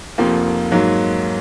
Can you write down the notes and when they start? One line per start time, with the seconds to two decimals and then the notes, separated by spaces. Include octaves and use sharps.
0.18 F1 F2 F3 A#3
0.72 G#2 F#3 A#3